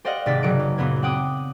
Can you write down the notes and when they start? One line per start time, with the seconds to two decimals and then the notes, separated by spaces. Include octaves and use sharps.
0.05 G4 C5 D5 D#5 F5 F#5
0.26 G#1 C3 D5 A6 B6
0.43 F#1 F#3 C#7 D7
0.59 C#4
0.78 F#1 F#2 A#2 B3 C5 G#6
1.02 C4 F#5 G5 D6 D#6